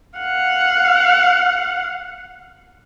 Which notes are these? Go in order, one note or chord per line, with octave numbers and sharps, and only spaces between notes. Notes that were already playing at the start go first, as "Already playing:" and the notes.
F5 F#5